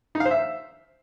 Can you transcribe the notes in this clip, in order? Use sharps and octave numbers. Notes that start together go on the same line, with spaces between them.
D#4
F5
C5
E5